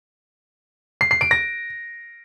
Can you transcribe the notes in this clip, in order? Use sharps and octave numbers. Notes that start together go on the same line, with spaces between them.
C7
C7
D7
A#6